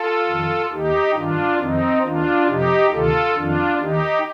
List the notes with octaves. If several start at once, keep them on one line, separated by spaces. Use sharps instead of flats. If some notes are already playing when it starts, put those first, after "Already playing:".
Already playing: F4 A4
F2 D#3
D#2 D#3 D#4 G4
G2 D#3 D4 F4
F2 D#3 C4 D#4
D#2 D#3 D4 F4
F2 C3 F3 D#4 G4
D2 C3 D#3 F4 A4
F2 D#3 D4 F4
D#2 D#3 D#4 G4